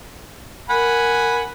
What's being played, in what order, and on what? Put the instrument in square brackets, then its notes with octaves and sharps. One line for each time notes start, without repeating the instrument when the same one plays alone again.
[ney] A#4 [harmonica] F#5 G#5 B5